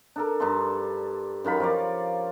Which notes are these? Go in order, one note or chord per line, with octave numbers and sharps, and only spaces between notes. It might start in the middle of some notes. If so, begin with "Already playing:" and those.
D4 A4 A#4
G2 D4 A5 C6
F#2 D#3 F4 B5
F3 A#4 C#5 D5